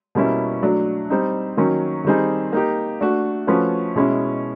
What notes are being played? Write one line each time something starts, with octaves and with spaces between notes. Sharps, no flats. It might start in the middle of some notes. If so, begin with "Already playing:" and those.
B2 G3 A#3 C#4 E4
F#3 A3 D4
G3 C4 D#4
D#3 F#3 A#3 C#4
D#3 G3 C4 D#4 G#4
A#3 D#4 G4
A3 D4 F#4
F3 A3 C#4 F#4 B4
B2 G#3 C#4 E4